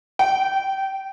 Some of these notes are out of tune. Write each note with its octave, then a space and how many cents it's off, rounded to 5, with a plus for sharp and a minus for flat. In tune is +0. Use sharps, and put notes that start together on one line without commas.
G5 -20